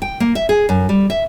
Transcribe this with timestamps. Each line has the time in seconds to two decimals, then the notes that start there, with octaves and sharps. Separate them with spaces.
0.02 G5
0.20 A#3
0.35 E5
0.49 G#4
0.69 F#2
0.89 G3
1.10 E5